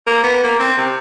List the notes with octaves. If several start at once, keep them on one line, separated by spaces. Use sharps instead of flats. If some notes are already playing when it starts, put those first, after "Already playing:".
A#3
B3
A#3
C4
C3